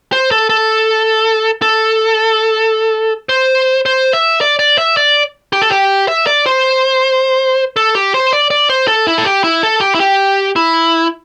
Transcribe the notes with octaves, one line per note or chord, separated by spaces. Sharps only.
C5
A4
A4
A4
C5
C5
E5
D5
D5
E5
D5
G4
A4
G4
E5
D5
C5
A4
G4
C5
D5
D5
C5
A4
E4
A4
G4
E4
A4
G4
E4
G4
E4